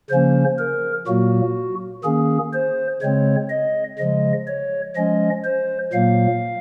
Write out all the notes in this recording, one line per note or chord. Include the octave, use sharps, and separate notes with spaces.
C#3 F3 A#3 C#4 C5
A#4
A#2 F#3 A#3 F#4
D#3 A#3 C#4 G#4
C5
C#3 G#3 C4 C#5
D#5
C#3 F3 G#3 D#5
C#5
F3 G#3 C#4 D#5
C5
A#2 F#3 A#3 F5